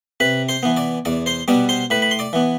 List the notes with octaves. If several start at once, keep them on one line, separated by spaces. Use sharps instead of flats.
C3 B4 B5
C5 C6
E3 B3
D5 D6
E2 D5 D6
C5 C6
B2 G3 B3 D5 D6
C5 C6
A2 B4 B5
B5
C6
D5 D6
E3 B3